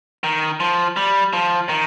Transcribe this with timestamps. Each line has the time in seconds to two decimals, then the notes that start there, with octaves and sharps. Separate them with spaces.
0.24 D#3
0.60 F3
0.97 G3
1.33 F3
1.69 D#3